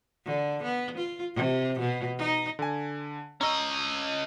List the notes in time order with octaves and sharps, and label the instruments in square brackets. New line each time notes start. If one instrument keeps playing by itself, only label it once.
[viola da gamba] D3
B3
F4
C3
B2
D#4
[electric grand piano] D3 G#5
[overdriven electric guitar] C#4 D#5 [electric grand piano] A#5 C#6 E6